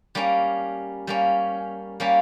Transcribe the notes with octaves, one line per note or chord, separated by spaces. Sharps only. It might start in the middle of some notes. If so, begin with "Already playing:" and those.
G3 A#3 C#4
G3 A#3 C#4
G3 A#3 C#4